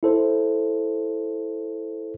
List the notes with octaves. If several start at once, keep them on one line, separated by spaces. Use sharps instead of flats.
E4 A4 C5